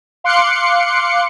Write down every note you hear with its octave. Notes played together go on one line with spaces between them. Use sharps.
F5 C6 D6 F#6 C#7